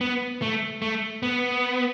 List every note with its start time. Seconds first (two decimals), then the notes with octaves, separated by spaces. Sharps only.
0.01 B3
0.42 A3
0.82 A3
1.23 B3